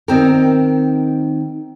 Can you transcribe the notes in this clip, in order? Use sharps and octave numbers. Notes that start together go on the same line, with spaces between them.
D#3 C4 A#4